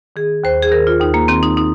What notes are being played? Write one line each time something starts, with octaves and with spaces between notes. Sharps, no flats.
D#3 G#4
D#2 C5
G#4
D#3 A#4
F4
D#2 D#4
A#3
D#3 C4
D#4
D#4